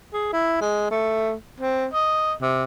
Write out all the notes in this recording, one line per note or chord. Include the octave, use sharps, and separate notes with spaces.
G#4
E4
G#3
A3
C4
D#5
C3